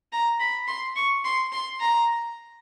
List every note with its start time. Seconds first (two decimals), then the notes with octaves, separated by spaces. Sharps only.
0.12 A#5
0.40 B5
0.68 C6
0.96 C#6
1.24 C6
1.52 C6
1.80 A#5